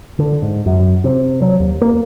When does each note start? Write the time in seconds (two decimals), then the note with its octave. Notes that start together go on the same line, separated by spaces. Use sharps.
0.19 D3
0.42 G#2
0.66 F#2
1.04 C3
1.42 F#3
1.60 D#2
1.81 A#3